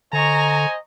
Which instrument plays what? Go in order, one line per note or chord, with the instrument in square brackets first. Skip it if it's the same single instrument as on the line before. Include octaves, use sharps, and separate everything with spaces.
[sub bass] D3 [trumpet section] C5 D#5 G#5 [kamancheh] A#5 C#6